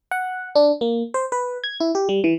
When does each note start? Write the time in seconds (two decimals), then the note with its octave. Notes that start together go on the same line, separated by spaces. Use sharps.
0.11 F#5
0.55 D4
0.81 A#3
1.14 C5
1.32 B4
1.64 G#6
1.80 E4
1.95 G4
2.09 G3
2.24 E3